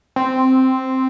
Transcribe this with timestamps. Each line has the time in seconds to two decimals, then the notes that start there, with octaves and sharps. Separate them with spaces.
0.16 C4